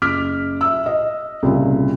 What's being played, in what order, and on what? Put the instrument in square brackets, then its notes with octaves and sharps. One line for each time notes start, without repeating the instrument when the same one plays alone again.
[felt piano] F#1 D6 F6 B6
E5 E6
D#5
C2 A#2 C#3